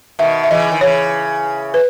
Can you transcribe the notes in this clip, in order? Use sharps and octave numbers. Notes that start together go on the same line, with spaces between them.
B2 D#3 E5
E5
C#3 E3 D#5
D#3
C#3 E3 C#5
B4